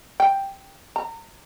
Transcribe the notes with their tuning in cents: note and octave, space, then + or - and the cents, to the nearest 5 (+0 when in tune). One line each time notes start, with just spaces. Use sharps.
G5 +0
A#5 -30